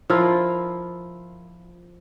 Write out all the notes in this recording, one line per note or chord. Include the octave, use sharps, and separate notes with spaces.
F3 E4 F4 A#4